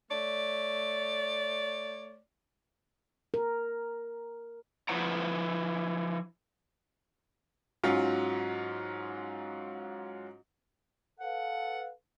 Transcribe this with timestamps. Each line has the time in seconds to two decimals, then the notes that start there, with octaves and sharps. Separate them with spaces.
0.11 A3 C#5 D5
3.34 A#4
4.89 F3 E4 B4 C5 F#5 A#5
7.83 G#2 F#3 C#4 F4
11.20 A4 B4 F5 F#5